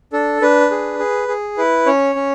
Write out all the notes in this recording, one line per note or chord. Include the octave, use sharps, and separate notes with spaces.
D4 A4
D4 B4
G#4
G#4
G#4
E4 B4
C#4 C#5
C#4